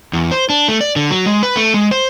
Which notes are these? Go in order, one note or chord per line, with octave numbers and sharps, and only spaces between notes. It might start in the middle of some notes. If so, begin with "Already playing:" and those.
E2
C5
D4
A3
D5
D3
F#3
G#3
B4
A3
G#3
C5